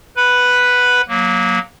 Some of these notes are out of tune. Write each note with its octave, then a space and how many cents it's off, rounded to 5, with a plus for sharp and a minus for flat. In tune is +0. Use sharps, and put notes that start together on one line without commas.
B4 +0 F#5 +0 B5 +0
F#3 -15 A#3 +0